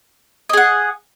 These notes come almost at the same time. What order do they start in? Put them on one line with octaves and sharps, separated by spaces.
D#5 G#4 F#5